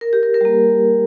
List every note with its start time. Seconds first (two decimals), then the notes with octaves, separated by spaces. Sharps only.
0.01 A#4
0.13 G4
0.23 A#4
0.34 A#4
0.41 G3
0.45 A#3